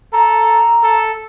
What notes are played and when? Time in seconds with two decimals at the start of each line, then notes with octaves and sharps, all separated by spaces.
0.13 A4 A#5
0.83 A4